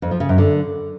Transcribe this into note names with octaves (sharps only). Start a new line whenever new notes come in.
F2
F3
C#3
F#2
D3